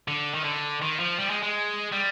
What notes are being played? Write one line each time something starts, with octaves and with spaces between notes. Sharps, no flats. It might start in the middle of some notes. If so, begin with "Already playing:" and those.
D3
D#3
D3
D#3
F3
G3
G#3
G#3
G3